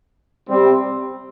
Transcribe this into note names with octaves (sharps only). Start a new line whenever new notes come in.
C3 G3 C4